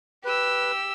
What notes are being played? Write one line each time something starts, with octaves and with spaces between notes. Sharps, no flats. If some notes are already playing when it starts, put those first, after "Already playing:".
G4 B4 E6